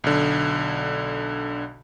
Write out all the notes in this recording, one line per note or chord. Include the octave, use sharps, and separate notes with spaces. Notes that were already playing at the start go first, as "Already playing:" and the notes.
B1 D3